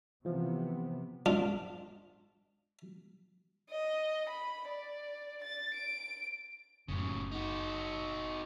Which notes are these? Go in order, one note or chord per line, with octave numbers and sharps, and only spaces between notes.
C3 E3 F3 B3
G#2 D4 F4
D#5
B5
D5
A6
D7
F#1 A2 C#3
D#4 F#4